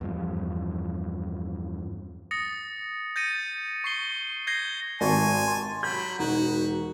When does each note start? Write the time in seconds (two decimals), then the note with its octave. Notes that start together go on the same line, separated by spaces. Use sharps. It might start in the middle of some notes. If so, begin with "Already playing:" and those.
0.01 E2 G2 F3
2.31 D#6 A6 A#6 C#7
3.16 G6 A6 A#6 C#7 D#7
3.84 C#6 C7 G7
4.47 G6 G#6 A#6 C7 G7
5.01 G#1 G#5 A5 C#6
5.48 C6
5.83 F#3 B5 G6
6.19 E1 D#4 F#4